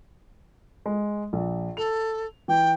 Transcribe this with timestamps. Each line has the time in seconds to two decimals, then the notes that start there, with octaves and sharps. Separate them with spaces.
0.86 G#3
1.33 A#1
1.77 A4 F7
2.48 E3 G5